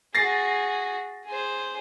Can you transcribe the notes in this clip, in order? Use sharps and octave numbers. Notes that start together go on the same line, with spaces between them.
F#4 G#4 A6 A#6 C7
G#4 C5